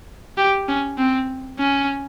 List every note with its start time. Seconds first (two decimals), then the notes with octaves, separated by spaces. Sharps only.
0.38 G4
0.68 C#4
0.98 C4
1.58 C#4